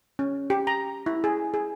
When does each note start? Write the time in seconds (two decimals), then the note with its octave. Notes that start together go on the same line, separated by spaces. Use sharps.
0.19 C#4
0.50 G4
0.67 A#5
1.06 E4
1.24 G#4
1.54 G#4